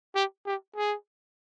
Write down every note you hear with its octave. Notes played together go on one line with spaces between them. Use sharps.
G4
G4
G#4